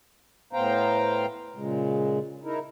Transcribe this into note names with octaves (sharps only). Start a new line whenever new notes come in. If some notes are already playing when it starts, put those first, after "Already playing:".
A2 B3 C5 F5 G5 A#5
A#2 C#3 G#3
D#4 E4 A#4